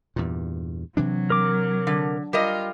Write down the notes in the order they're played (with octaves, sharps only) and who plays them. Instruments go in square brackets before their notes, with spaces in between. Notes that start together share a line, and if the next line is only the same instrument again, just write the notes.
[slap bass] E2 G2 A#2
[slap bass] C3 E3 D4 [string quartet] F#3
[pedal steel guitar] A#4 D6
[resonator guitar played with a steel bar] D3
[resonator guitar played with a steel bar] G3 A#4 D#5 [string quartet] F4